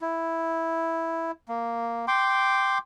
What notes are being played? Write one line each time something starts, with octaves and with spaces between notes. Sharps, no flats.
E4
A#3
G5 C6 D6